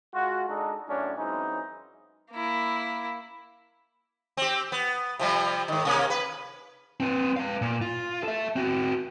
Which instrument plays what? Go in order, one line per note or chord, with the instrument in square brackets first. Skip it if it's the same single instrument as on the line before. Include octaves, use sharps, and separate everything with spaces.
[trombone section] G#3 F4 F#4
G#3 D4 D#4 A4
F#2 A2 C#4 D4
F#2 E3 G#3 C4 D#4
[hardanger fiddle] A#3 E4
[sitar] C4 G4
B3
C3 F3 G3
G#2 D#3
C3 A#3 C#4
B4
[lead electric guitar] C4 B4
B4 F5
A#2
F4
A4 E5
C4 F#4